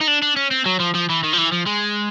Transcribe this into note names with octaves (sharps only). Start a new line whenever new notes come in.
D#4
D4
D4
C#4
C4
F#3
F3
F3
E3
D#3
F3
E3
F3
G#3